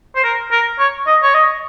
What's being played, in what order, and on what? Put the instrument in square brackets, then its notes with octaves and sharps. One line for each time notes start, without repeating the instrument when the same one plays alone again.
[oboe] C5
A#4
A#4
C#5
D#5
C#5
D#5